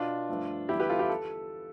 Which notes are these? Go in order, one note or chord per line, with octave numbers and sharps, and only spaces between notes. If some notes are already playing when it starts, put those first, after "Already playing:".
Already playing: B2 B3 D4 F4
G2 F3 A3
E2 D3 G3 E4 G4
G4 B4
F4 A4
E4 G4
A4